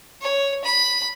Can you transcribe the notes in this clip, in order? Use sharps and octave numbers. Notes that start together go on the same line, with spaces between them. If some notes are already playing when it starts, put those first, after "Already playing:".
C#5
B5